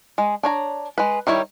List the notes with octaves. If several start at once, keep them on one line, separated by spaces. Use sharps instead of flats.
G#3
D4 C#5 A#5
G#3 B4
D#3 G3 E4 C#5